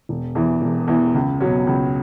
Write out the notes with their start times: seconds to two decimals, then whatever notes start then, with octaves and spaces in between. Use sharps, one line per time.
0.09 E1
0.35 E2 E3
0.62 E1
0.88 E2 E3
1.15 C#2
1.41 B2 F#3 C#4
1.67 C#2